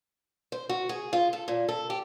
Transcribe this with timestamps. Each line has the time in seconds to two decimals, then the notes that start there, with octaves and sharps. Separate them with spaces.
0.52 C5
0.69 F#4
0.89 G#4
1.13 F4
1.33 A4
1.48 A#2
1.69 A4
1.90 G4